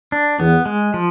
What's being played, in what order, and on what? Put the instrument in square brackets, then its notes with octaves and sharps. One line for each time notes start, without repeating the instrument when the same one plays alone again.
[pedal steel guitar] D4
[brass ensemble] E2 [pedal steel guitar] B3
[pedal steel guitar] G#3
F3